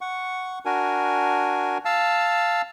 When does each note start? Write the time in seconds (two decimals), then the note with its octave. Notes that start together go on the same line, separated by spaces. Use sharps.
0.01 F#5 C#6
0.65 D4 F#4 A#4 G#5
1.85 F5 A5 E6